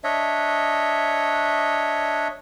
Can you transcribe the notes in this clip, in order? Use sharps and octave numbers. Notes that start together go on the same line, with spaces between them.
D4 C#5 D#5 E5